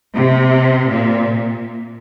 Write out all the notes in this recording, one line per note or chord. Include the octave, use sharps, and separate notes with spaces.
C3
A#2